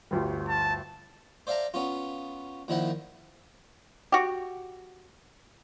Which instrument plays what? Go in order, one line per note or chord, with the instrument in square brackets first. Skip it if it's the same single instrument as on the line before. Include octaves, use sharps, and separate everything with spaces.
[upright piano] G1 D2 G3
[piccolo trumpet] A5
[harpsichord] C5 D5 E5 F5 A5 A#5
B3 C#4 F4
A#2 D#3 F3 E4 F#5
[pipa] F#4 G4